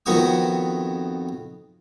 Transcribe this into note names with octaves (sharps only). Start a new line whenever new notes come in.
F2 D#3 B3 F#4 C#6 D#6